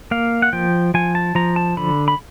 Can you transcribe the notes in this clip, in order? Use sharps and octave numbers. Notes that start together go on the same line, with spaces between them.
A#3 F5
F#5
F3 G5
F3 G#5
A5
F3 A#5
A5
D3 B5
B5